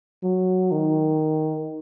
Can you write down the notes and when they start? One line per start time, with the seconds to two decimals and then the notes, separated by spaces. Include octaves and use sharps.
0.23 F#3
0.72 D#3